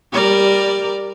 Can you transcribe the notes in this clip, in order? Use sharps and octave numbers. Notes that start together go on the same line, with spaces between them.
G3 A#4 D5